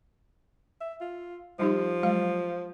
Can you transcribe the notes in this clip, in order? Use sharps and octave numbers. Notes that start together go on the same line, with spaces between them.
E5
F4
F3 G3 D#4 G4
F#3 G#3 F5